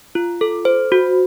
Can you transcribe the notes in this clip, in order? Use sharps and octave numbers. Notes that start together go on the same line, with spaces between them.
F4
A4
C5
F#4